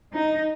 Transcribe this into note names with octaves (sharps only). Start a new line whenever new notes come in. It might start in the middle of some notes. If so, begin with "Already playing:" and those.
D#4